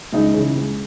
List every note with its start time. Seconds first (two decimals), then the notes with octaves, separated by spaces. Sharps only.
0.13 C#2 D#4
0.34 C#3 E3
0.55 C#2